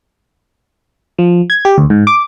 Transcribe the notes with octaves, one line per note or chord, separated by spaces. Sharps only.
F3
G#6
G4
D2
G#2
D6